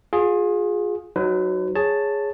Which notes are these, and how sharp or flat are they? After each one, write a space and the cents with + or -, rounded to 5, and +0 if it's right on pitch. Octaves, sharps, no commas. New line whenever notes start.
F4 +35 G#4 +0
F#3 +0 D#4 +0 B4 +35
G#4 +0 C#5 +0 A5 +5